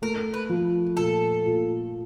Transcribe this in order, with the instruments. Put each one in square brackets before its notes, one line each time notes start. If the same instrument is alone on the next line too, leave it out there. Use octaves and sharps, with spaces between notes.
[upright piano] A3 [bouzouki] A#4
[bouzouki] B4
[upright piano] F3
[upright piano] A#2 [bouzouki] A4
[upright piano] A#2